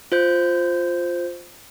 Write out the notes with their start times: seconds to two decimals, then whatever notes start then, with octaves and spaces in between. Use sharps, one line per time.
0.12 F4 C5 G6